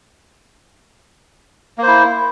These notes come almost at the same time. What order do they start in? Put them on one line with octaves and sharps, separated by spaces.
A#3 C5 E4